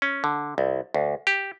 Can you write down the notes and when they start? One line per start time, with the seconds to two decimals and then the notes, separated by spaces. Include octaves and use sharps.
0.02 C#4
0.24 D3
0.58 C2
0.94 D2
1.27 G4